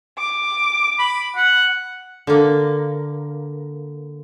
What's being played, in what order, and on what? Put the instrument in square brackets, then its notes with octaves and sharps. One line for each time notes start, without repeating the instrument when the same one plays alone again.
[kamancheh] D6
[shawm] B5
F#5
[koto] D3 A#3